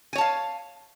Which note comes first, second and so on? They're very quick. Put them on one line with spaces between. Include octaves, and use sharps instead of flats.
G#5 C#5 A5 F5